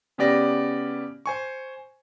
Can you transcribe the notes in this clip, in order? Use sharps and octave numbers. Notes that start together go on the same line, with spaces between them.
C#3 B3 C#4 G4 D5 A#6
C5 G#5 C#6